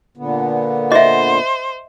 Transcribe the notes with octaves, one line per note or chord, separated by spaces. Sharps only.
A#2 D3 B3
C5 D#5 E5